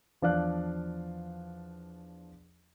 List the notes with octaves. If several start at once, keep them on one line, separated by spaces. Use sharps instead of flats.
E2 F3 D4 D5 F5 F#6